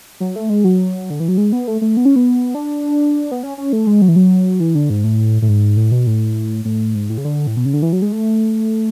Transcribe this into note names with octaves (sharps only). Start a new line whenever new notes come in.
F#3
A3
G#3
F#3
D3
E3
F#3
G#3
B3
A3
A3
B3
C#4
B3
D4
B3
C#4
C#4
A3
G#3
F#3
E3
F#3
E3
D3
G#2
A2
A2
G#2
A2
B2
A2
A2
G#2
A2
C#3
D3
A2
B2
C#3
D3
E3
F#3
G#3
A3